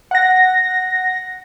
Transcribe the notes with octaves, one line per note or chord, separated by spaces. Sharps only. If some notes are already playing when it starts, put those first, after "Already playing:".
F#5 A#6